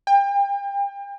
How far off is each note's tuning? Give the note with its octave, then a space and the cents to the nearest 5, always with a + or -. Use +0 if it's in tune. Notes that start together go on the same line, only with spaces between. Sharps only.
G5 +35